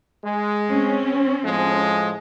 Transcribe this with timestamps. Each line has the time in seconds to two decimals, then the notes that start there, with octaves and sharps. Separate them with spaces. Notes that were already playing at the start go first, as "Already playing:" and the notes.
0.25 G#3
0.69 C4 C#4
1.43 A2 F3 G#3